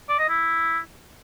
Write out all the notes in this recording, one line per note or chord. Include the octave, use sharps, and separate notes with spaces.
D5
D#5
E4